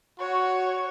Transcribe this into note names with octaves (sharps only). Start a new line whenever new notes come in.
F#4 C#5